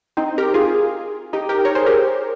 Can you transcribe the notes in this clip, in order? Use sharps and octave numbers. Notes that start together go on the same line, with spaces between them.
C4 D#4
G4 A#4
F4 G#4
D#4 G4
G4 A#4
A#4 C#5
G#4 C5
G4 A#4